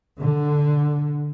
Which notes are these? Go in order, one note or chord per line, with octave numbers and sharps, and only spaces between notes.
D3